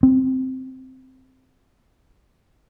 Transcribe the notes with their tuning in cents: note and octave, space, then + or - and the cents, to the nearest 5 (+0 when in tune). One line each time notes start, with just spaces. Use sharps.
C4 -5